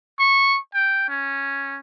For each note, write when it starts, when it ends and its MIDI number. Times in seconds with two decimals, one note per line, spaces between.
0.19 0.59 85
0.74 1.08 79
1.09 1.79 61